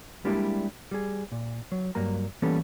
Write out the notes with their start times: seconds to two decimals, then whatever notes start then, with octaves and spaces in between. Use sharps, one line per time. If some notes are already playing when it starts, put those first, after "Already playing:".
0.25 G3 G#3 A#3 D4 E4 G4
0.91 G3 G#4
1.32 A#2
1.72 F#3
1.95 G2 F#3 A#3 A#5
2.42 E3 G3 A#3 B3 C#4 A4